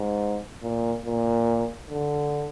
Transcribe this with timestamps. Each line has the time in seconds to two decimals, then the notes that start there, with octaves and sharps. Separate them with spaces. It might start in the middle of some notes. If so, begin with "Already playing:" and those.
Already playing: G#2
0.62 A#2
1.05 A#2
1.90 D3